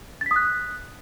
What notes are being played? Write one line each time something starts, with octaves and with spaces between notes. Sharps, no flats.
D#6 F#6 A6 B6